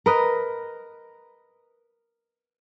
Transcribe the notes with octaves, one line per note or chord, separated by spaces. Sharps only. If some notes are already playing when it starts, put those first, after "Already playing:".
A#4 B4 D#5